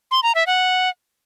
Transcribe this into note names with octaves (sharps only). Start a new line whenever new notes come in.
C6
A#5
E5
F#5